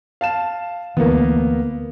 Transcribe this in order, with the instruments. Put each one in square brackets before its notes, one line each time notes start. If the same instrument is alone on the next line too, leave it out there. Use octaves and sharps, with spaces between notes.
[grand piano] F5 A5 E7
[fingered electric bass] D2 E3 [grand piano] A#3 B3